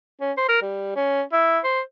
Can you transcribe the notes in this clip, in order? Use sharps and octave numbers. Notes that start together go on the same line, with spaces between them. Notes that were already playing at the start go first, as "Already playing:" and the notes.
C#4
C5
A#4
G3
C#4
E4
C5